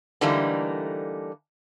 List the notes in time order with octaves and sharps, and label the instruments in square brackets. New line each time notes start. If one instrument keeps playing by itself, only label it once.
[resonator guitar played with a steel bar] D3 E3 G3 A3 A#3 D#4